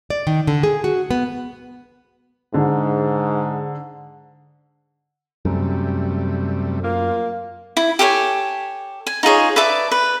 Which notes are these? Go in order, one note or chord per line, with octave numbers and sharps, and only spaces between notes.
D5
D#3
D3
G#4
F#4
B3
G#2 D3
F#2 C3 G3 A3
A#3 F4
E4
G4 A4 C#5 G#5
G#5
D#4 F4 G#4 C#5
B4 D5 E5 A5
B4